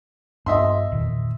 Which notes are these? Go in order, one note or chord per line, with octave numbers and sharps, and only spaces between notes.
G2 B3 D#5 E5 C6
E2 A#2 D#3